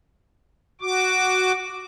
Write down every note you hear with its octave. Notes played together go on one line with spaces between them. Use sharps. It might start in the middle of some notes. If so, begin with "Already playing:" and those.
F#4 D6